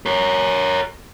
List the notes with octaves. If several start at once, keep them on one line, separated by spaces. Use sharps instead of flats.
A#4 C#5